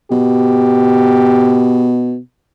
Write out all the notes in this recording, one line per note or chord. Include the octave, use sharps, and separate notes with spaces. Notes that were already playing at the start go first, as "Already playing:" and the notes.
B2 G4